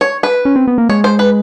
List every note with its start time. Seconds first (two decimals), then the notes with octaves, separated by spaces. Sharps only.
0.01 C#5
0.23 B4
0.45 C#4
0.56 C4
0.68 B3
0.78 A#3
0.89 G#3 C#5
1.04 C5
1.19 B4